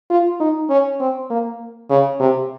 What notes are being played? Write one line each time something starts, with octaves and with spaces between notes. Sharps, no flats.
F4
D#4
C#4
C4
A#3
C#3
C3